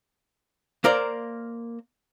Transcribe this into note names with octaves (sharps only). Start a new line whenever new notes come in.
A#3 A#4 C5 D5